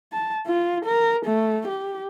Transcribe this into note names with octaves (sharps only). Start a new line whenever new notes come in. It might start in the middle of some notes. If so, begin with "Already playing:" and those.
A5
F4
A#4
A3
G4